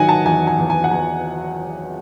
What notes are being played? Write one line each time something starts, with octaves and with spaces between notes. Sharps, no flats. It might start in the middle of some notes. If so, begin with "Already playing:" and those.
Already playing: D#3 F#3 D#5 F#5 G#5
A5
E2 G#5
G#5
E2
G#5
F#5
E2 G#5